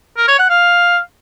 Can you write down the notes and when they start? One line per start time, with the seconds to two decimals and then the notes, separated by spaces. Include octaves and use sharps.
0.17 A#4
0.28 C#5
0.39 F#5
0.49 F5